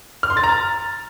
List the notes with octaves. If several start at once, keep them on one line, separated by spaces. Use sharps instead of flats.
F6
C6
A6
A#5